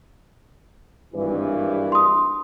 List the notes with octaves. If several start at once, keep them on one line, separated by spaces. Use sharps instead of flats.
G#1 G2 E3
C6 D#6